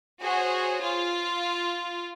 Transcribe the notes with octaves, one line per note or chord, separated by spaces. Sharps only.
F#4 G#4 C5 C#5
F4